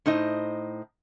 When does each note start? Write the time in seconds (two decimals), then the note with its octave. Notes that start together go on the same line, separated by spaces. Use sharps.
0.06 A2 D#4 C5 D#5